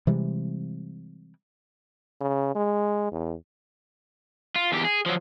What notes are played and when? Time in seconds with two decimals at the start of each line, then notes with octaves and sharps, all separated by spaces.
0.07 C3 E3 G3 G#3
2.21 C#3
2.55 G#3
3.12 E2
4.56 F4
4.72 E2 G4
4.85 G#4
5.06 F3 F#3